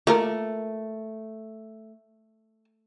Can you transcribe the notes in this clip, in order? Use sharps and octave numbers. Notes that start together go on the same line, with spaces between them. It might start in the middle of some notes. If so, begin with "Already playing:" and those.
A3 A#3 F4 A#4